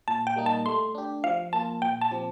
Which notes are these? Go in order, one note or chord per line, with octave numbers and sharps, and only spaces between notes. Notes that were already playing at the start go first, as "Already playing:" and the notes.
A#2 A5
G5
G3 A#3 D#4
A5
A3 C6
D4 G4
F3 F5
A#3 F4 A5
A#2 G5
A5
F3 C4 G4